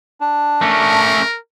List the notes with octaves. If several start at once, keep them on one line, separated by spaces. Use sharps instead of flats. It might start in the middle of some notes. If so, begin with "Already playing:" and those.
D4
A3 C#4 A#4